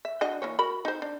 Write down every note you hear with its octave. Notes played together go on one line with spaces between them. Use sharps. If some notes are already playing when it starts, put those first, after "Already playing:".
E5
D4 F#4 D#5
E3 A#3 C#5
F#4 A#4 B5
D#4 C5
D4